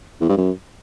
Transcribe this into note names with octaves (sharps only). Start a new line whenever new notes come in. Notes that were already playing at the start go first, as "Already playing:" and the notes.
E2
G2
F#2